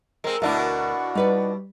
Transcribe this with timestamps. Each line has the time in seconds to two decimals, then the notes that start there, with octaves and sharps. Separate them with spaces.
0.24 G#3 C4 A#4
0.42 D2 G#2 B2 D4 E4 F#4 E5
1.15 G3 D#4 B4 D5